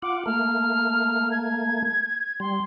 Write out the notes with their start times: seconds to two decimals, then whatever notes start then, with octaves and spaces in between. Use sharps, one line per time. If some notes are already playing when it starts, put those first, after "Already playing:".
0.02 F4 F#5 D6
0.26 A3 A#3 F6
1.31 G#6
2.40 G3 C6